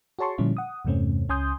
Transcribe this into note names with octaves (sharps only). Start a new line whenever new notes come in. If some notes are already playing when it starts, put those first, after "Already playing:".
F#4 G#4 C#5 A5 C6 C#6
A#2 D3 F3 G3 C#4 E4
F#5 D#6
E2 G2 C3 A3 C4 C#4
C#2 C#4 G#5 C6 D#6 G6